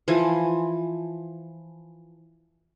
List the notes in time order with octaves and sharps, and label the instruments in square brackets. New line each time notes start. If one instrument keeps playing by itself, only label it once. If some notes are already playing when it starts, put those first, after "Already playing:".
[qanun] E3 F3 G#5